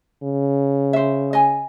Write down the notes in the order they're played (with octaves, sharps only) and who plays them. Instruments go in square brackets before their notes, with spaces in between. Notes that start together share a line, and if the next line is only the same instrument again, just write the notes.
[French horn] C#3
[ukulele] C5 E5
D#5 G#5